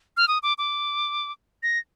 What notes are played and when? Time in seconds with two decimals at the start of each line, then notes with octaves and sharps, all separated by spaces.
0.17 F6
0.28 D#6
0.43 D6
0.58 D6
1.63 A#6